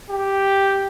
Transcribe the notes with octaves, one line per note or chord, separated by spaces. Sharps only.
G4